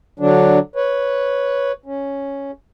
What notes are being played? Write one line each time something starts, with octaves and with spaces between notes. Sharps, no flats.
D3 F#3 D4
B4 C#5
C#4